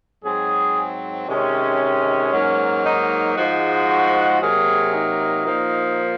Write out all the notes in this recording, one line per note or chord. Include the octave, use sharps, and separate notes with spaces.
G#2 F#3 C4 G#4
C3 D#3 G#3 C#4
G#2 F#3 A#3
D#4
G#2 F3 G#3 F#4
C3 F#3 A#3 G#4
D#4
A#2 F3 A#3